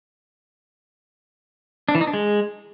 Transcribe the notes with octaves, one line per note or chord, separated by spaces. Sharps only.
D4
E3
D#4
D4
G#3